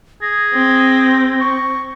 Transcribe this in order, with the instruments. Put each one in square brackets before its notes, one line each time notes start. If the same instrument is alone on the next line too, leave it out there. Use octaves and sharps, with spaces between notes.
[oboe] G#4 [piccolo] A#6
[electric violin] C4
[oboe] C#6